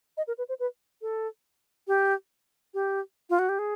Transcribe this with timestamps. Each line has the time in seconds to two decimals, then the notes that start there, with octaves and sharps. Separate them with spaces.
0.17 D#5
0.27 A#4
0.38 B4
0.49 C5
0.59 B4
1.02 A4
1.87 G4
2.74 G4
3.30 F4
3.39 F#4
3.49 G4
3.59 G#4